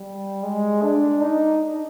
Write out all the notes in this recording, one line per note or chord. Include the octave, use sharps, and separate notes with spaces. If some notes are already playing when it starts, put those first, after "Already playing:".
Already playing: G3
G#3
D4
D#4